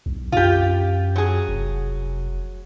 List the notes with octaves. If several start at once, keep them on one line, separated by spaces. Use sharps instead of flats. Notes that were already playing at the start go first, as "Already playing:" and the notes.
B1
F#2 F4 G4
F#3 G#4
F1